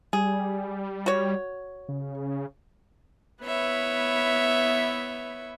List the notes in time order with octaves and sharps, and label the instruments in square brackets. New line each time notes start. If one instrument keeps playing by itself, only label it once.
[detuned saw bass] G3 [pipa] G#4
[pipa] F#4 C#5
[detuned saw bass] C#3
[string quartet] B3 E4 B4 C#5 E5